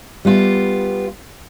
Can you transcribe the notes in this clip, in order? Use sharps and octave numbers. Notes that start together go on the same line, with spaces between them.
G3 B3 F4